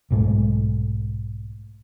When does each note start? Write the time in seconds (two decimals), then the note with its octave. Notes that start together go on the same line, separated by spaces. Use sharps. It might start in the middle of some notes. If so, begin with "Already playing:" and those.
0.11 B1 G#2 G#3 A3